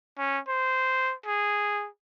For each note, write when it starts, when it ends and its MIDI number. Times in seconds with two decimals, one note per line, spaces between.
0.18 0.39 61
0.48 1.14 72
1.26 1.88 68